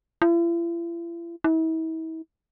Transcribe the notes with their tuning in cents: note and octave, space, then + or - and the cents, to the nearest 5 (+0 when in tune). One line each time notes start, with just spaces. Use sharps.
E4 +45
E4 -40